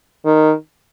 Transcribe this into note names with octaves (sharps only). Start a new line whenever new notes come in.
D#3